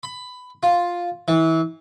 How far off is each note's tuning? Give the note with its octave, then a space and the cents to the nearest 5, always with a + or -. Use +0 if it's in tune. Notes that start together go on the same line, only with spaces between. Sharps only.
B5 +15
F4 +5
E3 -25